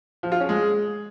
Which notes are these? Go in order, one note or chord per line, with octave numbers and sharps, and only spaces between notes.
F3
F4
C#4
G#3